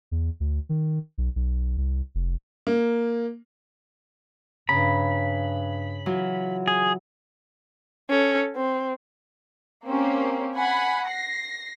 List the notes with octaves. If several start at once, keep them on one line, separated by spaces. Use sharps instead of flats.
E2
D2
D#3
B1
B1
C2
F1
A#3
G2 C#3 A#5 B5
E3 F#3 F4
G#4
C#4 A4
C4
A#3 C4 C#4 G4
F#5 G#5 B5
A#6 C7